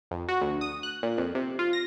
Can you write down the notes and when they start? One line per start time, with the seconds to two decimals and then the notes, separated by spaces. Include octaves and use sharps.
0.11 F2
0.29 F#4
0.41 D2
0.61 D#6
0.83 F#6
1.03 A#2
1.18 F2
1.35 C3
1.59 F4
1.73 A#6